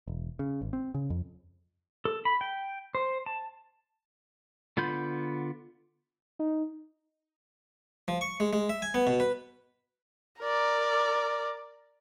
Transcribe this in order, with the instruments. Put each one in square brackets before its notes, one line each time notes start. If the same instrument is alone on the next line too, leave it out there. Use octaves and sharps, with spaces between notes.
[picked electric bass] E1
C#3
G#1
C4
C#3
F2
[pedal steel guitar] A4
B5
G5
C5
A5
D3 B3 F4 B5 G6
[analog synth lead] D#4
[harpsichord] F3
C#6
G#3
G#3
E5
G#5
B3
B2
B4
[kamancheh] A#4 D5